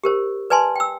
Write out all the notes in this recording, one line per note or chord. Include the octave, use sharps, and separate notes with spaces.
G4 A#4 C5
B4 D5 G#5 A5 C6
G5 E6